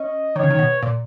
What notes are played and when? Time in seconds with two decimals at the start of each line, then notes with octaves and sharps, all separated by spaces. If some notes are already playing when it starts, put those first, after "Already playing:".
Already playing: C#4 D#5
0.36 D#3 C#5
0.43 C#3
0.50 D#3
0.59 B2
0.83 A#2